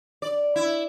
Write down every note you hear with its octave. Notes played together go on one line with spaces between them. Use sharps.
D5
E4